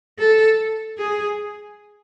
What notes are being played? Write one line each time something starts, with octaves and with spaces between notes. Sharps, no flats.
A4
G#4